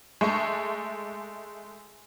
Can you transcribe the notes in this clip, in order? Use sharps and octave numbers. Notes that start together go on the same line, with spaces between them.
G#3 A3 C#6